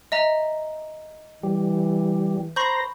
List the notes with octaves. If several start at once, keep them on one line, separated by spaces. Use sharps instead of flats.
D#5 E5 A#5
E3 G3
C5 A#5 B5 C#6 G6